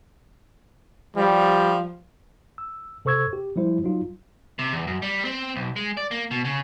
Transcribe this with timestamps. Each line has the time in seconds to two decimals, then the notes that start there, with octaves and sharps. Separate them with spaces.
1.16 F3 G3
2.58 E6
3.05 C3 A4 C5 C#6 E6 G#6
3.33 G4
3.56 F3 G3 E4 C5
3.84 F#3 D#4 F4
4.59 C3
4.73 E2
4.87 F#2
5.02 G3
5.25 C4
5.55 B1
5.76 G#3
5.97 D5
6.11 A#3
6.31 B2
6.45 C#3